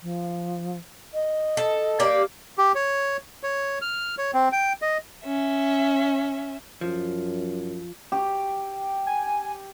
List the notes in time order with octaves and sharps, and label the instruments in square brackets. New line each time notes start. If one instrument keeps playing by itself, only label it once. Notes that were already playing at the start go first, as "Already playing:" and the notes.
[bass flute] F3
D#5
[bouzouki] A4
A#3 G4 D5
[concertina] G4
C#5
C#5
F6
C#5
C4
G5
D#5
[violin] C#4 E5
[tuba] F#2 [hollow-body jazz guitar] F3
[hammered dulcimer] G4
[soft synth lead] G#5